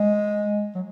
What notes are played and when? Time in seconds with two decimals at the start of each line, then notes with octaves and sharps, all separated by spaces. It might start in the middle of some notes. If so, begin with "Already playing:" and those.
Already playing: G#3
0.75 F#3